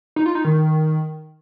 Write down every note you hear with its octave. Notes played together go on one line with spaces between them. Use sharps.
D#4
F4
D#4
D#3